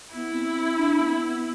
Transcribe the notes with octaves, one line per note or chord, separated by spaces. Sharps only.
B3 E4
B3
C4
C4
D4
B3
C4
B3